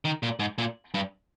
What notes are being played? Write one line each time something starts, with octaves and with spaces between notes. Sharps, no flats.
D#3
A#2
G#2
A#2
G2